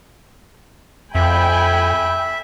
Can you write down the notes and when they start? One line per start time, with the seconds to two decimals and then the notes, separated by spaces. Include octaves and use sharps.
1.15 F2 E5 G5 G#5 B5